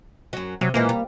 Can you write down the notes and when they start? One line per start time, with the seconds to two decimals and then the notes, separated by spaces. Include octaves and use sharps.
0.33 F#2 F#3
0.61 C3 F#3
0.74 A#2 E3 G#3 A#3
0.89 G3